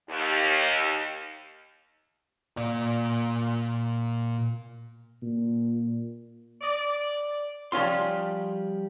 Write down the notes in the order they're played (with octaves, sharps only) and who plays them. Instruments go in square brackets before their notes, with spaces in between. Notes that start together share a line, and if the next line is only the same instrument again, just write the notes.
[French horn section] D#2
[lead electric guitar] A#2 D5
[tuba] A#2
[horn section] D5
[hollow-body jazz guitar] F3 G3 C#4 F4 C6